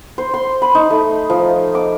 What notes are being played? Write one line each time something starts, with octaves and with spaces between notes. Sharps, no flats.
C5
C6
B5
D#4
A3
F3
D6